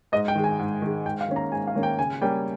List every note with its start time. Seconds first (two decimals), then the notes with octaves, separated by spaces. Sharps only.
0.12 G#2 D#5
0.28 G5
0.36 D#3 G#3
0.44 G#5
0.59 G#2
0.82 D#3 G#3
1.06 G#2 G5
1.21 F5
1.28 D#3 A#3 C#4
1.36 A#5
1.52 G#2 G#5
1.67 F5
1.75 D#3 A#3 C#4
1.83 G5
1.99 C#3 G#5
2.21 G3 A#3 C#4 G5